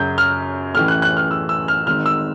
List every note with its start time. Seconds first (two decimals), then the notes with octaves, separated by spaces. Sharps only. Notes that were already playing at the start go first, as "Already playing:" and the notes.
Already playing: F#2 C#3 F#3 G6
0.18 F6
0.75 A1 A2 E3 F6
0.88 F#6
1.02 F#6
1.17 F6
1.31 E6
1.49 E6
1.68 F6
1.87 G#1 G#2 D#3 F6
2.06 E6